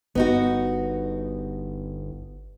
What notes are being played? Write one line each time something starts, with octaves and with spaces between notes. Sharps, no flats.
G1 B3 D#4 F#4